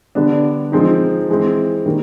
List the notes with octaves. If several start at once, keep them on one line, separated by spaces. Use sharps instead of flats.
D3 G3 B3 D4
F3 G#3 C4 D#4
E3 G#3 C4
D#3 G3 A#3